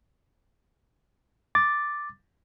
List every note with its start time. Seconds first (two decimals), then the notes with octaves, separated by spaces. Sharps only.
1.55 D6 A6